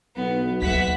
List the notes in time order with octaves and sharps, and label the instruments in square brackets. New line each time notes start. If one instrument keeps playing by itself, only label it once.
[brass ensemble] B1 [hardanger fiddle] B3
[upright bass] D#2 [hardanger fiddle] B4 E5 [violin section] F#5 B6